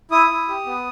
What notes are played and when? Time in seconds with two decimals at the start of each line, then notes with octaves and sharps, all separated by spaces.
0.11 E4 D#6
0.30 E4
0.48 G4
0.66 B3